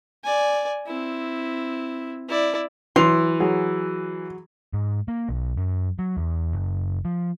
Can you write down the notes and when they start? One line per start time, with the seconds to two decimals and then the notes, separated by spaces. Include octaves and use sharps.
0.24 D5 G#5
0.86 C4 E4
2.29 E4 D5
2.96 E3 F#3 E4 C6 F7
3.40 F#3 F#4 G#4
4.73 G#2
5.08 A#3
5.29 B1
5.57 F#2
5.99 F#3
6.17 E2
6.53 F#1
7.05 F3